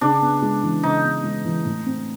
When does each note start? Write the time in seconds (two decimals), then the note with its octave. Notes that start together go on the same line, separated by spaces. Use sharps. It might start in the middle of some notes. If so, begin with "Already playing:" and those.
0.01 C#3 D4
0.22 B3
0.42 G#3
0.63 E3
0.83 C#3 D#4
1.04 B3
1.23 G#3
1.45 E3
1.65 A2
1.86 C4